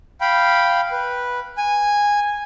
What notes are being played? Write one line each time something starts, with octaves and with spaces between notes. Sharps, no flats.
F5 G5 B5
B4
G#5